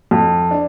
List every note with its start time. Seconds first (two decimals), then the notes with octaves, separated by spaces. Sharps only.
0.11 F2
0.51 D4